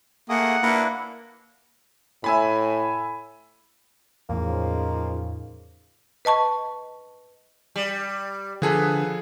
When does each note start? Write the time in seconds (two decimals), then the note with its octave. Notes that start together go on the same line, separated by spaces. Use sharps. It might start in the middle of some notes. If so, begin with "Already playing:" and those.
0.29 A3 A#3 G#4 F#5 D#6
0.63 A#3 D4 E4 B4
2.24 A2 E5 G#5 B5
4.29 E2 A2 C#3 F3 A#3 D#4
6.25 B4 D#5 A5 C#6
7.76 G3
8.62 D3 F3 B3 G#4 A4